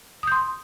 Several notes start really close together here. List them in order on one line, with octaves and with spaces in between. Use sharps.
D#6 G6 C6